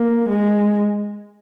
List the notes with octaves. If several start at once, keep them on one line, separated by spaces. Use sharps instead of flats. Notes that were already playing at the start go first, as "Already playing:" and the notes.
Already playing: A#3
G#3